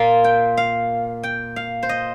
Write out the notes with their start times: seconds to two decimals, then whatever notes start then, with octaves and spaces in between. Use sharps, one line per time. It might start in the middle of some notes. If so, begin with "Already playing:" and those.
Already playing: A#2 A#3 F4
0.24 G5
0.57 F5
1.23 G5
1.56 F5
1.83 C5
1.89 D#5